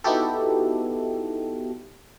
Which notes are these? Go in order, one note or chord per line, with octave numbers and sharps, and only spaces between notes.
B3 D#4 E4 F#4 G4 A4